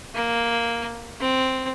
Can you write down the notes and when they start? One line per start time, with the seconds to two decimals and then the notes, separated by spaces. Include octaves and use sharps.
0.14 A#3
1.20 C4